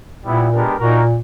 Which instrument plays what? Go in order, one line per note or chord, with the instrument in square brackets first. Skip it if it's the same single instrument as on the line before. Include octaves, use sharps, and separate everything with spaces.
[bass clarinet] A#2 [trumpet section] G3 B3 E4
[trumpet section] G#3 B3 D4 G4 A#4
[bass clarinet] A#2 [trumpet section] A#3 D#4 F#4 A#4